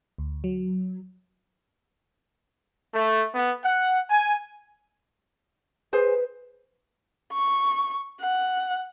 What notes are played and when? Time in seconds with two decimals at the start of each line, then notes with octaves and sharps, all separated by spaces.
0.18 D2
0.44 F#3
2.94 A3
3.35 B3
3.65 F#5
4.10 G#5
5.93 G#4 B4 C5 G#5
7.33 C#6
8.21 F#5